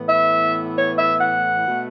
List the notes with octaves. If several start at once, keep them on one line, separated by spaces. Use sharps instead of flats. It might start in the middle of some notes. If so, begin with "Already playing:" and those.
Already playing: A2 E3 B3
E5
C#5
E5
F#5
B2 A3